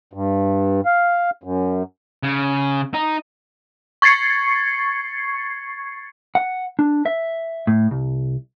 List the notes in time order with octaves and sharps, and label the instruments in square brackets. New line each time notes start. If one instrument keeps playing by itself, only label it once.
[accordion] G2
F5
F#2
[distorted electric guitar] C#3
D#4
[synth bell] C#6 G#6 A6 C7 C#7
[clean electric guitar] F#5
D4
E5
A2
C2